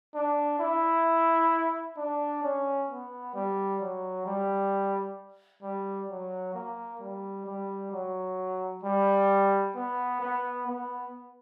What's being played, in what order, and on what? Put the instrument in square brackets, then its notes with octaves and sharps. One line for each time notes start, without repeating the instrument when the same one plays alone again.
[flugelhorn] D4
E4
D4
C#4
B3
G3
F#3
G3
G3
F#3
A#3
G3
G3
F#3
G3
B3
B3
B3